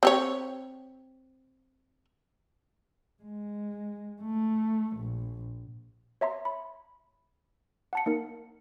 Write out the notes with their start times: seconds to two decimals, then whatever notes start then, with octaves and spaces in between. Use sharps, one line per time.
0.03 C4 G4 C#5
3.22 G#3
4.22 A3
4.97 A#1
6.21 C#5 E5 A#5 C6
6.45 B5
7.93 F#5 A5 C#7
8.06 A#3 D#4 A#4